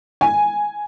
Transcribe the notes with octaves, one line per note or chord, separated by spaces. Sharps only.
G#5